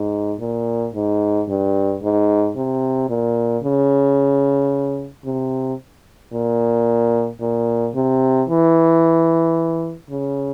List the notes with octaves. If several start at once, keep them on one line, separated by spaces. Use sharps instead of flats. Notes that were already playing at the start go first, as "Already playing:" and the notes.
Already playing: G#2
A#2
G#2
G2
G#2
C3
A#2
C#3
C3
A#2
A#2
C3
E3
C#3